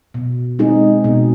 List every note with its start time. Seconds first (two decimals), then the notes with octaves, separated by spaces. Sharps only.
0.14 B2
0.59 G#3 C4 D#4 G#4
1.04 B2